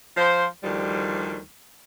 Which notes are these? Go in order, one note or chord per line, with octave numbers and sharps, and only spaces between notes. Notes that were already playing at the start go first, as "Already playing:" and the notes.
F3 C5
D2 D#3 F3 G3